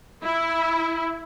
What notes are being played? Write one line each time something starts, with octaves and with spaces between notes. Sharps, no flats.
E4